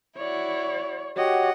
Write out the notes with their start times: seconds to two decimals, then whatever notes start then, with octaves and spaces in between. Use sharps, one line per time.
0.17 E4 F#4 C#5 D5
1.16 F#4 G4 C#5 D#5 F#5